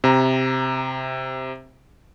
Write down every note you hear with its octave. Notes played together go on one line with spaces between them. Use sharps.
C3 A#5